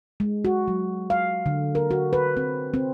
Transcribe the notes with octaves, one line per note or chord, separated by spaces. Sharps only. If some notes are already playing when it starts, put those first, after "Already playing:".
G#3
F#4
F#3
F5
D3
A#4
F#4
B4
C4
C4